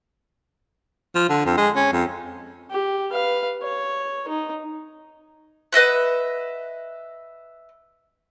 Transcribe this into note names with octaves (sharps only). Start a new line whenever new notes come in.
F3
D3
F2
G#3
C#4
F2
G4
B4 F5
C#5
D#4
B4 D#5 E5 F#5